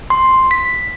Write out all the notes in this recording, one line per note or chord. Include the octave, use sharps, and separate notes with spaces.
C6
B6